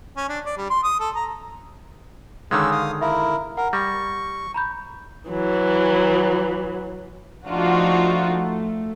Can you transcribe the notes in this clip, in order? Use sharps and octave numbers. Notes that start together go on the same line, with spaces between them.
C#4
D4
D5
G3
C6
D#6
A4
A#5
D3 D#3 G#3 C#4 F5 E6
F5 D#6
E4 A#4 E5 F5
A#4 F#5
G3 C#6 A#6
A#5 B5 G6
E3 F#3
F3 A3 D4 D#4 F4 F#4
A3